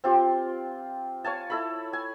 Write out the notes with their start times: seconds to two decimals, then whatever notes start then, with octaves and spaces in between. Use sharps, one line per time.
0.04 C4 F4 G4
1.24 C#5 F5 G#5 A5
1.50 E4 A4 B5
1.93 G#5